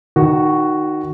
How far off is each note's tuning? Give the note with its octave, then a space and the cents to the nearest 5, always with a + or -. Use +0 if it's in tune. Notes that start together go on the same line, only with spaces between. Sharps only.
D#3 -15 F#4 +0